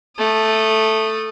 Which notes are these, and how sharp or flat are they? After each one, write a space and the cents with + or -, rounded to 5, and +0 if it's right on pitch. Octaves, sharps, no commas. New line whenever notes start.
A3 +0 D#6 -20